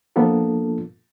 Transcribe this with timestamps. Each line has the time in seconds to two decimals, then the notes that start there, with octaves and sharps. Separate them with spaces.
0.16 F3 A#3 B3 D4 F4 A4